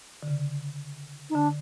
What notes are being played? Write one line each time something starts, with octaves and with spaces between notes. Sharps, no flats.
D3
C#3
D#4
D3 D4